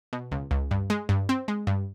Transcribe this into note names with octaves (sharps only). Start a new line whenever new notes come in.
B2
C#2
C#2
G2
G#3
G2
C4
G#3
G2